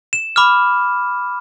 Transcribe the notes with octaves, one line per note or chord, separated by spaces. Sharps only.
E7
B5 D6 F6